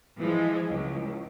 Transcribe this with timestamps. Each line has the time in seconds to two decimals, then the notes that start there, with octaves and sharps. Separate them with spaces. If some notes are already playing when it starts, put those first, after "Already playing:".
0.17 E3 F3 G#3
0.69 C#2